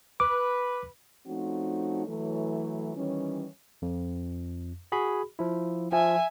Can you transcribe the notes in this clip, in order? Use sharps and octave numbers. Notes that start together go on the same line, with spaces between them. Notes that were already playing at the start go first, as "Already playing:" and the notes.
B4 D6
F3 A3 C4 C#4 D#4 F#4
E3 F#3 A3
D#3 E3 G3 C#4
F2
F#4 G#4 B5
F3 E4
F3 E5 G#5